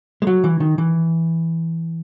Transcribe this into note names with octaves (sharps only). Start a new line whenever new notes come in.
G#3
F#3
E3
D#3
E3